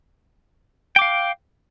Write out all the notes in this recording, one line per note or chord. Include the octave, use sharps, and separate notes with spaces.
F5 G5 D6